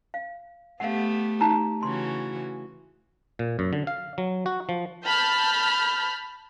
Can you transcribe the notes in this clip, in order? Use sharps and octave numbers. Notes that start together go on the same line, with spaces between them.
F5
A3 B3 G4 F5 F#5
D#4 A5 A#5
C#3 E3 F#4 C6
A#2
F#2
D3
F5
F#3
F#4
F3
A5 B5 F6 G6